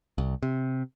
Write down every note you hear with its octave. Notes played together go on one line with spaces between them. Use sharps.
C2
C3